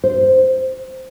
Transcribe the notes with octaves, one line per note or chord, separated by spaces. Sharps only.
C5